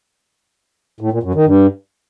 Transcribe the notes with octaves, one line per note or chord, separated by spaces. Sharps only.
A2
A#2
F#2
D#3
G2